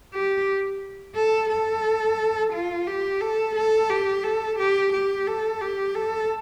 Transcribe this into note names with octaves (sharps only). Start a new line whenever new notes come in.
G4
A4
A4
F4
G4
A4
A4
G4
A4
G4
G4
A4
G4
A4